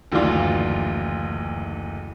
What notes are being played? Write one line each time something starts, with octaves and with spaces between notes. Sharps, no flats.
F#1 D2 D#3 E3 D4 F4